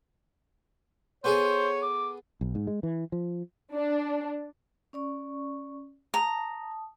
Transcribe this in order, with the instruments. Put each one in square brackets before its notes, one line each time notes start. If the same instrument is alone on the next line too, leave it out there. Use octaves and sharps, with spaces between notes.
[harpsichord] B3 G#4 A4 [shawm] C5 [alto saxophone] C#5
[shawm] D6
[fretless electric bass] B1
G#2
G#3
E3
F3
[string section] D4
[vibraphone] C#4 D5 C#6
[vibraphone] A5 D#6 [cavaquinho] A#5